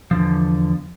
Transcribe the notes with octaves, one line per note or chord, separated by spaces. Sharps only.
E2 D3 F3